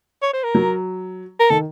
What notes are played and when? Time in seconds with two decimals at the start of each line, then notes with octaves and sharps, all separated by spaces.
0.22 C#5
0.33 C5
0.43 A#4
0.55 F#3
1.39 A#4
1.50 D#3 A4